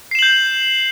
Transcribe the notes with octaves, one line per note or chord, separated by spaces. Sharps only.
G6 C7 E7 F#7